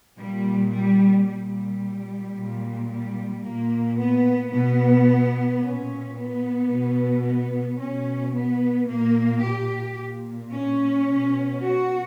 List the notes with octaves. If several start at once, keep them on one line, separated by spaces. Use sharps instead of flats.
A#2 G3
G3
A#2 G3
A#2
G3
A#2 A#3
B3
B2 B3
A#2 C#4
B3
B2
B3
B2 C#4
B3
A#2 A#3
G4
A#2
C#4
B2
F#4